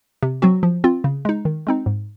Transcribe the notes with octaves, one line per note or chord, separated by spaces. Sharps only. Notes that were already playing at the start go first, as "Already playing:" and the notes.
C3
F#3 C4 F#4
F3
C4 F4
C#3
G#3 D#4
D#3
G#3 C4 D#4
G#2